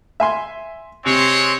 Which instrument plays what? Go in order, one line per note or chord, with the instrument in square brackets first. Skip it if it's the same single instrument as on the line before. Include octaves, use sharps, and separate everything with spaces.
[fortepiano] E5 G#5 C6
[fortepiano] C3 [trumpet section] G#3 C4 C#5